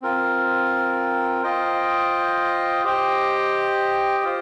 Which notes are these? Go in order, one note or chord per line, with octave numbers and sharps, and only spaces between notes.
C4 F4 A#4
F4 C5 D#5 G5
G4 C5 D#5 G5
F4 C5